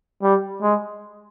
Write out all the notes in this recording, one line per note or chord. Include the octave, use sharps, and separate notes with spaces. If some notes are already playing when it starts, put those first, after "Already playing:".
G3
G#3